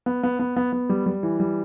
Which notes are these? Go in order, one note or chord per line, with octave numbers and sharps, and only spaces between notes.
B3
B3
B3
B3
B3
G3
G3
E3
G3